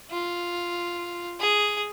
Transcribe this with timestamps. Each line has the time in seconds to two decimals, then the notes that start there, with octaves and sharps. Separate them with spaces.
0.11 F4
1.40 G#4